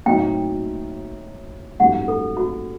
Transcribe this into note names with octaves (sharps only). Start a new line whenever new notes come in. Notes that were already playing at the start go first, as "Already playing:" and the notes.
A2 F#3 C4 D#4 G5
A1 G2 F#3 A3 D#4 F#5
A4
F#4